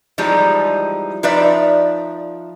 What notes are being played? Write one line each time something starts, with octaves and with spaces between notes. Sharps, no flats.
E3 F3 G3 G#3 D#4
F3 D#4 B4 D5 E5